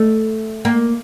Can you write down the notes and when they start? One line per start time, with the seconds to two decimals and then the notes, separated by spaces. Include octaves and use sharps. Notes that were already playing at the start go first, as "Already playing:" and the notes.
Already playing: A3
0.65 A#3